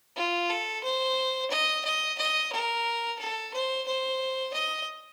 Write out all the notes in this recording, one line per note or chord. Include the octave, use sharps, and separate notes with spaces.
F4
A4
C5
D#5
D#5
D#5
A#4
A4
C5
C5
D#5